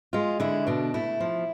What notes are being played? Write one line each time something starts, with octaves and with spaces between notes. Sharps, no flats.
G#3 F4
D3 E4
B2 D4
A3 E4
F3